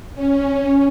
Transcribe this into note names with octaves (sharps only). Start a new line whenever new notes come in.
C#4